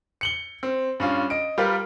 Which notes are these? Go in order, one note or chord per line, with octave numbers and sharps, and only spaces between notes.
C#7 F#7 G7
C4
G2 C#4 F4
D#5 D7
G3 F4 G4 A#4 B4